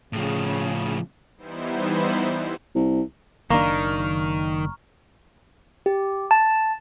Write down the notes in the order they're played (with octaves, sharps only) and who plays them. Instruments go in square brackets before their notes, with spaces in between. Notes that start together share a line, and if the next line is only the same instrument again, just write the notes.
[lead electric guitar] A2 F3 [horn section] C#3
[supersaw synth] E3 G3 B3 D#4 E4 C5
[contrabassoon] C2
[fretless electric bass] F#1 D4 [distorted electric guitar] D#3 [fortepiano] A#3 [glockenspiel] A#5 C#6 F6
[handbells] G4
A5